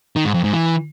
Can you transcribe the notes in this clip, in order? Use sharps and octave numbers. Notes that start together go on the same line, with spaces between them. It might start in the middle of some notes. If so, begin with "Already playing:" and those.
D#3
G#2
F2
G#2
E3